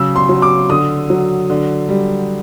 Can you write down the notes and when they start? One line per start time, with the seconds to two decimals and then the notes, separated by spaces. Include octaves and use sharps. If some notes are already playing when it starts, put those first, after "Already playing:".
Already playing: C#3 F#3 E6
0.16 C6
0.29 F#3
0.42 D6
0.70 D3 D#6
1.10 F#3
1.50 D3
1.89 G3